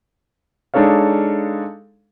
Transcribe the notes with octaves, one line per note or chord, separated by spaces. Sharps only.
G#3 D4 D#4 A4 C#5 F5